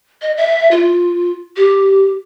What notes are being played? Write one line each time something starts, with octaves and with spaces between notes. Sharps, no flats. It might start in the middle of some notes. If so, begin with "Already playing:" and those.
D#5
E5
F4
G4